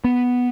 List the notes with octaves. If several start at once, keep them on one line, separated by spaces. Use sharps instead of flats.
B3